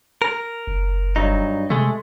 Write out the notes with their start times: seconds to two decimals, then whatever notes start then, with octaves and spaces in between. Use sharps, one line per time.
0.22 A#4
0.67 F#1
1.16 G2 F#3 D#4
1.70 C3 G#3 A3